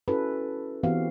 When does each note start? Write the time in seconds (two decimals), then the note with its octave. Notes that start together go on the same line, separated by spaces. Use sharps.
0.08 C#4 E4 F#4 A4 B4
0.83 E3 B3 C4 F#4 G4 F5